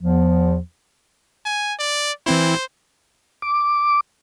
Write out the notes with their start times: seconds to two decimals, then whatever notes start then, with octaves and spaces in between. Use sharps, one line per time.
0.01 E2 F3
1.45 G#5
1.79 D5
2.26 E3 C4 E4 C5
3.42 D6